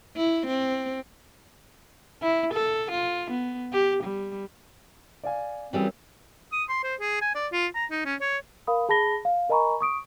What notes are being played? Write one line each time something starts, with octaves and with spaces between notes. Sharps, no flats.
E4
C4
E4
A4
F4
B3
G4
G3
D5 F5 G#5
F#2 E3 G3 C4 G#4
D#6
C6
C5
G#4
G#5
D5
F4
A#5
D#4
C#4
C#5
A#4 F5 B5 D#6
G#4 A5 B5 A#6 G7
F5
A#4 D#5 G#5 A#5 B5 C#6
C#6 D#6 D7